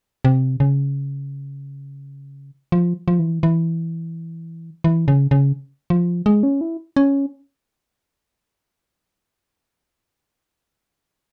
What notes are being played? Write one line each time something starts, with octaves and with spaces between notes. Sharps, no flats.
C3
C#3
F3
F3
E3
E3
E3
C#3
C#3
F3
G#3
C#4
E4
C#4